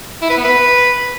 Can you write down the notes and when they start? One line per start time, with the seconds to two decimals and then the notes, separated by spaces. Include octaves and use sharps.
0.22 E4
0.30 B4
0.37 B3
0.45 B4